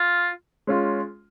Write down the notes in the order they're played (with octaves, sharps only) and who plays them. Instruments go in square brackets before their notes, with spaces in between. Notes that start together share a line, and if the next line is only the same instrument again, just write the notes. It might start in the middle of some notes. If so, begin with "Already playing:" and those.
Already playing: [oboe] F4
[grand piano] G#3 C#4 F4